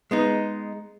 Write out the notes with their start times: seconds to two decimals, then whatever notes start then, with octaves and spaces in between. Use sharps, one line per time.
0.11 G#3 B3 D#4